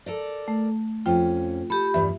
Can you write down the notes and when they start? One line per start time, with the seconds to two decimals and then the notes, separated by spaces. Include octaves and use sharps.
0.06 A4 A#4 D5
0.48 A3
1.06 F2 C#4 F4 G5
1.70 G4 A4 B5
1.94 E2 G2 E5